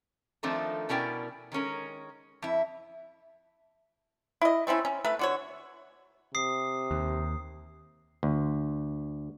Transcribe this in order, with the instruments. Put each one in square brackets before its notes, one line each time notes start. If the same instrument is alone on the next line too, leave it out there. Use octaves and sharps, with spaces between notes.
[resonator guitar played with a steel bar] D#3 F3 A3 C4 D4 D#4
B2 C#4 E4 A#4 D5 G5
D#3 G#3 C#4 A#4
F2 E4
[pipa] E4 D#5
A3 C4 C#4 E4
C#4
A3 B4
D3 F#4 C#5
[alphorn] C3 [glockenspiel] D#6 C7
[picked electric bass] D#2
[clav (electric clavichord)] D2